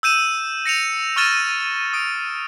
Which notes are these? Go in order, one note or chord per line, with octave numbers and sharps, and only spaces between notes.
E6 G6 D#7 E7
A#6 C#7 D#7 F7
C#6 E6 F6 A6 D#7 E7
D#6 D7